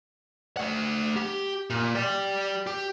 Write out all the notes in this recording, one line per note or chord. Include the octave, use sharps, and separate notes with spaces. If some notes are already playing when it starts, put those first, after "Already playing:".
A3 F#5
G4
A#2
G4 D5
G4